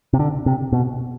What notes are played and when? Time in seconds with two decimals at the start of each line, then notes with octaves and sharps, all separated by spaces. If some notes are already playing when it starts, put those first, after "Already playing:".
0.13 C3
0.19 D3
0.46 C3
0.72 B2